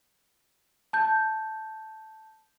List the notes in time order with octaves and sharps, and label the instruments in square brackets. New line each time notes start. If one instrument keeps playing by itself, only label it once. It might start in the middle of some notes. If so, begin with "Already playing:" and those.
[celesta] A5 G6